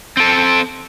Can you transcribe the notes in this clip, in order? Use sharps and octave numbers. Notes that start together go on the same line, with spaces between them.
C4 A4